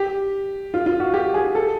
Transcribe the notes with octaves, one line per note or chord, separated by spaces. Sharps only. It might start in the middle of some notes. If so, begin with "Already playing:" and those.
Already playing: G4
F4
F4
F#4
G4
G#4
A4